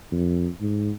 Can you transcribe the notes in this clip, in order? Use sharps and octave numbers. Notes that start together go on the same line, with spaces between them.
F2
G#2